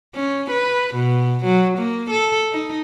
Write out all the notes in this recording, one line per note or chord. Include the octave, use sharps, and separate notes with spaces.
C#4
B4
B2
F#3
A#3
A4
D#4